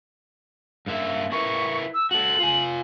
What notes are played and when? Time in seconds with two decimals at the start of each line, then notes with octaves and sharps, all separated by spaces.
0.87 G2 A#3 E5
1.32 E4 A#4 B4 C#6
1.94 E6
2.11 F#4 A4 F#7
2.39 F4 G#5